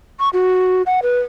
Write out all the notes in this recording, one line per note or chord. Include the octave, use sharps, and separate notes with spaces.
C#6
F#4
F#5
B4